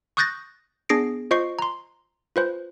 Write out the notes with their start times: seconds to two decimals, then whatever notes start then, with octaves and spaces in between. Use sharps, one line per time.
0.17 C#6 D#6 F#6 G6 A6 A#6
0.89 B3 D4 G#4 A#6 C7 D7
1.31 F4 C5 D#5 C#6 C7
1.59 A#5 C6
2.36 F4 B4 C5